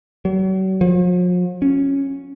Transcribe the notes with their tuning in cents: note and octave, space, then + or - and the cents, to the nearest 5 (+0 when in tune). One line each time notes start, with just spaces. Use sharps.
F#3 +40
F3 +45
C#4 -10